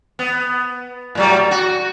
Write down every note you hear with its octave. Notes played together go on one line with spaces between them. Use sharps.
B3
A2 F#3 G3
F#4